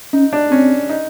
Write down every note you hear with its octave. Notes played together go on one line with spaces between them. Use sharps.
C#4 D#4
D4
C4 C#4
D#4